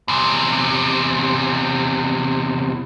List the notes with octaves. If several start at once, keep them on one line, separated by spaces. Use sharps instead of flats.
E2 C3